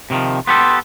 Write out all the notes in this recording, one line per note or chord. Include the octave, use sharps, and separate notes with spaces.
C3 D#3 F3
B3 G4 A4 C6